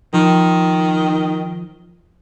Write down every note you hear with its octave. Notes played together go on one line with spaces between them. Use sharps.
D#3 F3